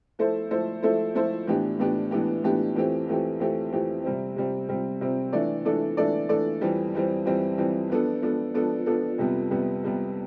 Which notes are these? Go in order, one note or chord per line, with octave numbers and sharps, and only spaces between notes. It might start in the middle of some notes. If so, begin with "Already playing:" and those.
F3 A3 E4 A4 C5
F3 A3 E4 A4 C5
F3 A3 E4 A4 C5
F3 A3 E4 A4 C5
A2 E3 B3 D4 G4
A2 E3 B3 D4 G4
A2 E3 B3 D4 G4
A2 E3 B3 D4 G4
F2 E3 A3 C4 G4
F2 E3 A3 C4 G4
F2 E3 A3 C4 G4
F2 E3 A3 C4 G4
C3 G3 C4
C3 G3 C4
C3 G3 C4
C3 G3 C4
E3 A3 D4 A4 D5
E3 A3 D4 A4 D5
E3 A3 D4 A4 D5
E3 A3 D4 A4 D5
F2 E3 G3 C4
F2 E3 G3 C4
F2 E3 G3 C4
F2 E3 G3 C4
F3 B3 D4 A4
F3 B3 D4 A4
F3 B3 D4 A4
F3 B3 D4 A4
F2 C3 G3 B3
F2 C3 G3 B3
F2 C3 G3 B3